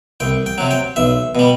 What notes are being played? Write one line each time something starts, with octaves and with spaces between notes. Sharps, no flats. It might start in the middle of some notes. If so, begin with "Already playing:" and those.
C2 G5
G5
C3 F#3
G5
B1 E5
B2 G3